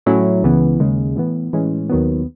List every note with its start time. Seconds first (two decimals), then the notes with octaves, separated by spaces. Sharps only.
0.06 A2 F#3 A3 C#4 E4
0.43 C#2 C#3 E3 B3
0.80 D#2 C#3 G#3
1.16 A2 E3 B3
1.53 A2 E3 G#3 C#4
1.90 D#2 D#3 F#3 B3